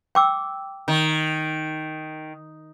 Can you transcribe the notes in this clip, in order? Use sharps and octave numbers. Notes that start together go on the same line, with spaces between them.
G5 D6 E6
D#3